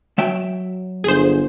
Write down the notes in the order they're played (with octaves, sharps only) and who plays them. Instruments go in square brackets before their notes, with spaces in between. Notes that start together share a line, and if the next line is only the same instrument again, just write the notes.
[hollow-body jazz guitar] F#3 E5 G5
[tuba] G1 [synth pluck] G#4 C5